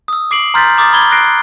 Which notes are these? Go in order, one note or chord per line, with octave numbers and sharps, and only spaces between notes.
D#6 E6
D6 C7 D7 F#7
A#5 C6 F6 G6 A6 B6
A#5 D6 D#6 F6 A6
B5 D6 G#6 G7
F#6 A#6 C7 D7